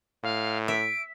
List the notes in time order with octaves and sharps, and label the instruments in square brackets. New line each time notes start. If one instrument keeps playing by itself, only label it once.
[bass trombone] A2 [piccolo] F5
[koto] E5 [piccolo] D7